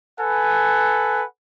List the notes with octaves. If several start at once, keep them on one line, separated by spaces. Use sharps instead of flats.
A4 B4 F#5 G#5